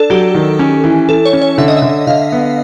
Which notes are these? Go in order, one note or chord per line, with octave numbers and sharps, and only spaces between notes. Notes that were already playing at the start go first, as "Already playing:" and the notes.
Already playing: D4 A4
F#3 G4
D#3
C#4
E3
E3 A4
C#5
C#4
C#5
D3 E5
D#5
E5
D3
D3 F5
B3